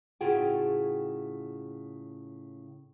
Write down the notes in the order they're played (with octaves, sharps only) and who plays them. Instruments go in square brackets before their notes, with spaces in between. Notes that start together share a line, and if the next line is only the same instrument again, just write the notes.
[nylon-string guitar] A2 C#3 F4 F#4 G#4 G5